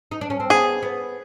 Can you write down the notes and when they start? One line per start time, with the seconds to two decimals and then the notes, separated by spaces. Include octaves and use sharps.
0.11 D#4
0.21 D4
0.30 C#4
0.40 C4
0.50 B3 G#4
0.83 B3